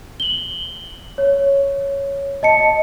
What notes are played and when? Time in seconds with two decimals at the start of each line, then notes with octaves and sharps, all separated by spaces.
0.20 F#7 G7
1.18 C#5
2.43 D#5 A5 C#7